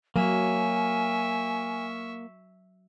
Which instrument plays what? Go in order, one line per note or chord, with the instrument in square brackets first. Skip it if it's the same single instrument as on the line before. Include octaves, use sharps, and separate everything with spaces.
[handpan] F#3 [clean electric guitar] A#3 [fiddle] E5 C#6 [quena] G#5